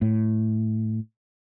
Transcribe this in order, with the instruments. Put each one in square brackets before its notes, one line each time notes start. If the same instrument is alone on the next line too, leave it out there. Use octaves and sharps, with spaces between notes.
[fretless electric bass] A2